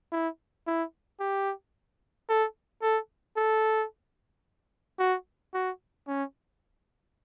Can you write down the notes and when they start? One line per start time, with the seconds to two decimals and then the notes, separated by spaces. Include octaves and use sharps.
0.12 E4
0.67 E4
1.20 G4
2.29 A4
2.82 A4
3.37 A4
4.99 F#4
5.54 F#4
6.07 C#4